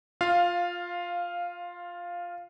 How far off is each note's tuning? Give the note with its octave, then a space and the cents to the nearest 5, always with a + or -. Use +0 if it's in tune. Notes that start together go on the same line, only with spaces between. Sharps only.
F4 +10 F5 +0